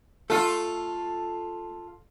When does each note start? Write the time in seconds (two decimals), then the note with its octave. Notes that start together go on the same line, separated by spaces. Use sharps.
0.30 A3 F4 A4